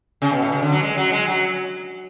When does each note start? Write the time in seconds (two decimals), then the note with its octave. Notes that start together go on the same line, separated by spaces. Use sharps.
0.22 C#3
0.32 B2
0.42 A2
0.52 C#3
0.62 D3
0.72 F#3
0.82 G#3
0.97 F#3
1.12 G#3
1.27 F#3